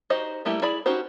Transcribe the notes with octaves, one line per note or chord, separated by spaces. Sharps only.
D#4 F#4 G4 C5 D#5
G3 A3 A#3 E4 G4
E4 G#4 D5 B5
C#4 D#4 F#4 G4 C5